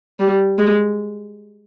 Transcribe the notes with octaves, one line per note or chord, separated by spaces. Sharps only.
G3
G#3